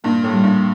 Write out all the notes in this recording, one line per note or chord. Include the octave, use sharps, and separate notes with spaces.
G2 A#2
A2
G3
G2